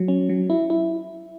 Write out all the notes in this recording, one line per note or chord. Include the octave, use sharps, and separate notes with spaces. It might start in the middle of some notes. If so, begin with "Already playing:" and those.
Already playing: F#3
C#4
F#3
E4
E4